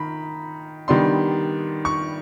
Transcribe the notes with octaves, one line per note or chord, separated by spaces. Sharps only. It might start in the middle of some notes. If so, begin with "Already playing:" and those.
Already playing: D#3 A#5 B5
D#3 G3 B3 D4 C6
C#6